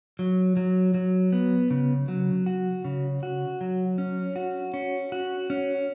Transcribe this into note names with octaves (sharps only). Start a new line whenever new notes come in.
F#3
F#3
F#3
B3
C#3
F#3
F#4
C#3
F#4
F#3
C#4
F#4
C#4
F#4
C#4